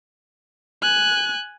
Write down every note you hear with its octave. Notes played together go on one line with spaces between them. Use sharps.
G#5 F#6